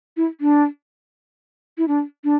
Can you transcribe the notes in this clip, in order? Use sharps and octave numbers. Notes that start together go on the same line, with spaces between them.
E4
D4
E4
D4
D4